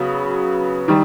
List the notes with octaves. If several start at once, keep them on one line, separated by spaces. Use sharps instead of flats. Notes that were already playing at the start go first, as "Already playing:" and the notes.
Already playing: C#3 F#3 B3
D#3 G3